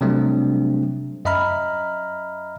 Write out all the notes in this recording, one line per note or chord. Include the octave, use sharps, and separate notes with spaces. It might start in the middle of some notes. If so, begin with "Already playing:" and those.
C3 F#3 G3 A3 C4 D4
F#2 D#5 E5 A#5 B5 F6